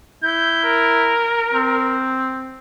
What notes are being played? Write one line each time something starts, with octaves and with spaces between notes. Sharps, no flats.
E4 G6
A#4
C4